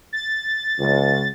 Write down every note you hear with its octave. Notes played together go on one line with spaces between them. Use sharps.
A6
C#2